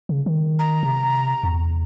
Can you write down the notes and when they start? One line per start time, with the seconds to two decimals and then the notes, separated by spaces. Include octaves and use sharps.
0.09 C#3
0.26 D#3
0.59 A#5
0.83 C3
1.43 E2